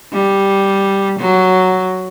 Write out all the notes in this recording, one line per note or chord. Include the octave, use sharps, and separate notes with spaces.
G3
F#3